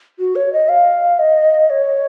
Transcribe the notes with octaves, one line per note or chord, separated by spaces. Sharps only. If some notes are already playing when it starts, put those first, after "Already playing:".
F#4
C#5
D#5
F5
D#5
C#5